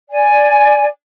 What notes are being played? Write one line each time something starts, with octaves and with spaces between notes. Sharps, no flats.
D5 G#5